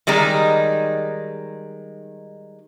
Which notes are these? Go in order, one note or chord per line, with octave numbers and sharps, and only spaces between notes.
D#3 G3 G#3 D#4